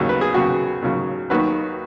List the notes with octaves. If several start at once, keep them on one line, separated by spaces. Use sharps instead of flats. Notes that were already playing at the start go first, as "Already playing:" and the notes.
Already playing: D#2 C#3 F#3
B4
G#4
D#2 C#3 F#3 F#4
D#2 C#3 F#3
D#2 D#3 F#3 F#4 B4